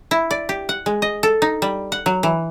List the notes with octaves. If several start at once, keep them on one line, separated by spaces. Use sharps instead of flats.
E4
D5
G4
F#5
G#3
D#5
A4
D#4
G3
F#5
F#3
E3